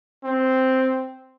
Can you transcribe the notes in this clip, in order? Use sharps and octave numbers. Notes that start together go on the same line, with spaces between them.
C4